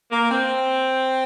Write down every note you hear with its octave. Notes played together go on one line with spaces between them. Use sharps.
A#3
C4